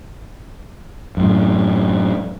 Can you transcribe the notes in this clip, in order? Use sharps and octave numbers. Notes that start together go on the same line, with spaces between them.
F#2 A2